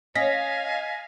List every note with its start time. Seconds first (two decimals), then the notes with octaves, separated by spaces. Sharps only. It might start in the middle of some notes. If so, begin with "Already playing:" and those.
0.15 C#4 D#5 F5 G#5 A#6 B6